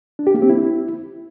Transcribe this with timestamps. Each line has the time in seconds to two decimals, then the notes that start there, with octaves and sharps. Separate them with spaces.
0.19 D4
0.27 G4
0.34 A#3
0.42 C4
0.50 E4